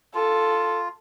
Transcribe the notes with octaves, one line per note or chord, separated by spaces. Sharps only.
F4 A4